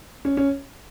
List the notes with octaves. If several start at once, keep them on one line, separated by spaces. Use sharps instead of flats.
C#4
C#4